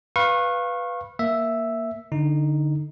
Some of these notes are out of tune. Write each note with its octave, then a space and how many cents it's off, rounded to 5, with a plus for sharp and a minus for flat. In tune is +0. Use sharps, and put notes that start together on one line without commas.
B4 +0 F5 +0 C#6 -30
A#3 +0 E5 +0
D3 +0 D#4 +0